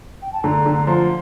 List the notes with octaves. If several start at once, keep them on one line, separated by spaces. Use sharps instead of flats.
G5
A5
D3 A#5
D3
A#5
F3 C6